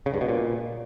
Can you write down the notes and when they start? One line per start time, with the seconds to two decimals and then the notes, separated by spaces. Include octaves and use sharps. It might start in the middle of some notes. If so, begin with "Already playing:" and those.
0.06 C#3
0.14 G2
0.21 B2
0.29 A#2